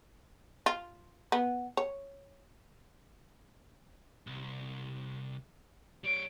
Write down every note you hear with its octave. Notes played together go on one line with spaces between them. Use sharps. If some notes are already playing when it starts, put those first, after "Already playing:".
F4
B3
C#5
C2
G3 C#5 D7